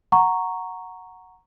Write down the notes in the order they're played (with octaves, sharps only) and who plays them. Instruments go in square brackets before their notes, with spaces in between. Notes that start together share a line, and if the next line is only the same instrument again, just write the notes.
[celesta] F#5 A#5 C#6